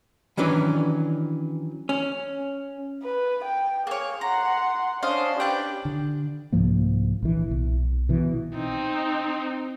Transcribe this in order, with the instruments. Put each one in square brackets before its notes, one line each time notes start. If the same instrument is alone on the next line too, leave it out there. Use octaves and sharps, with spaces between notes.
[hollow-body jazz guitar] D#3 E3 F#3 C#4 D4 B4
C#4
[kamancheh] B4
G5
[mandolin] A#3 C#5 [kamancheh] G#4
[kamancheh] F#5 C6 [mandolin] A#5
[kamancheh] C#4 D4 [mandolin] C5 D#5 F5
[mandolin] D4 B4 G5 [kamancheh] G4
[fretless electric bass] D3
C2 G#2 F3 A#3
A#1 E3
B1
B2 E3
[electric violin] C4 D#4